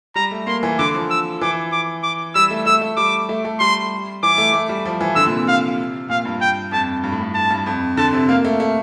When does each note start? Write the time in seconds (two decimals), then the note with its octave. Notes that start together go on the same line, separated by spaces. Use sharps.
0.16 G3 A#5
0.31 A3
0.47 A#3 C6
0.63 E3
0.79 D3 D6
0.94 F3
1.10 E6
1.41 E3 D6
1.72 D6
2.03 D6
2.35 G3 E6
2.50 A3
2.66 A3 E6
2.81 A3
2.97 G3 D6
3.29 A3
3.45 A3
3.60 G3 C6
4.23 E3 D6
4.38 A3
4.54 A3
4.69 G3
4.85 F3
5.01 E3
5.16 D3 E6
5.27 A#2
5.31 C3
5.48 F5
6.09 A#2 F5
6.25 G2
6.41 G5
6.72 F2 A5
7.03 G2
7.12 A2
7.21 G2
7.34 A5
7.51 G2
7.66 F2
7.97 D3 A5
8.13 C3
8.29 A#3 F5
8.45 A3
8.60 A3